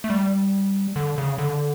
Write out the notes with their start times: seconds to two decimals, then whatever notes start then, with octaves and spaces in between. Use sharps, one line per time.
0.04 A3
0.10 G3
0.96 D3
1.18 C#3
1.38 D3